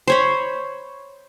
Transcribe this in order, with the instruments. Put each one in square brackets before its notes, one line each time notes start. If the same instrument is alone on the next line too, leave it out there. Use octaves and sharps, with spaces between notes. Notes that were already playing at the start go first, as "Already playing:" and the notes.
[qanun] C5 C#5 B5